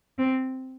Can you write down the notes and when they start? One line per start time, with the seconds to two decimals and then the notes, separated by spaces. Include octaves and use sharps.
0.18 C4